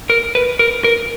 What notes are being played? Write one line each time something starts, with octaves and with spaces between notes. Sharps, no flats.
A#4
B4
A#4
A#4